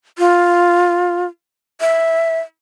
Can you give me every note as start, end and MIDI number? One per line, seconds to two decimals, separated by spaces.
0.18 1.25 65
1.81 2.40 76